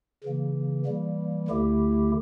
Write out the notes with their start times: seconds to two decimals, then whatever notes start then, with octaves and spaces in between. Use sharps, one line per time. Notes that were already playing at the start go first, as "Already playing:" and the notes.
0.24 C#3 E3 A#3
0.86 E3 G3 A#3
1.48 D2 D3 A3 E4 G4